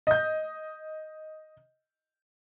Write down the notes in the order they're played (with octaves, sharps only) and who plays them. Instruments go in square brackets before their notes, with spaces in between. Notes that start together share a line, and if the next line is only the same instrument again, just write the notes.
[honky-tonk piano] D#5 G6